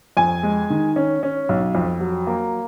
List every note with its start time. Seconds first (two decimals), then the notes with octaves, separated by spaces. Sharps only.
0.17 F2 G#5
0.43 G#3
0.70 D#3
0.96 C#4
1.23 C#4
1.49 B1
1.75 F2
2.01 F#3
2.27 A#3